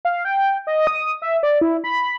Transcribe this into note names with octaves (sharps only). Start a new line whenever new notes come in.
F5
G5
D#5
D#6
E5
D5
E4
B5